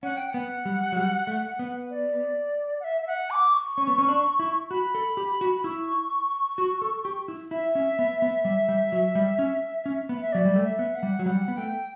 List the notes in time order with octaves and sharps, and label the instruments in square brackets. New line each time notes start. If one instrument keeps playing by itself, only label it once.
[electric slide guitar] C#4 [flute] F#5
[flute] G5
[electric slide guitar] B3 [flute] F#5
[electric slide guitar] G3
F#3
G3
A3
B3
[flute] D5
F#5
E5
E5
F#5
D6
C#6
[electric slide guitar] C#4
B3
C#4
D4
E4
[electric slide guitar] F#4 [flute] B5
[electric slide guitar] A4
G4
F#4
[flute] B5
[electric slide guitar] E4 [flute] C#6
[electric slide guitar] F#4
A4
G4
E4
[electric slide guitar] E4 [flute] E5
[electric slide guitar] C#4
B3
B3
G3
G3
F#3
G3
C#4
C#4
B3
[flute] E5
[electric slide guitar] F#3 [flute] D5
[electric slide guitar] G3
A3
[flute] E5
[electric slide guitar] B3
[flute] F#5
[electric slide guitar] G3
F#3
[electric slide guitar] G3 [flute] F#5
[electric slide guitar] B3
[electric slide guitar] A3 [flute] G5